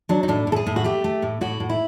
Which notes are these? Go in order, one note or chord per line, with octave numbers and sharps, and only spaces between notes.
F#3 D4
D#4
A2 D4
A2
A4
G#4
A2
F#4
A3 G4
A3
A2
A2 F#4
A2
E4